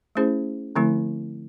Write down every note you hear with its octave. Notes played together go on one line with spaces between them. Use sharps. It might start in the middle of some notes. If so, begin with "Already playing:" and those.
A3 C#4 E4 G#4 C5
D3 F3 A3 C4 E4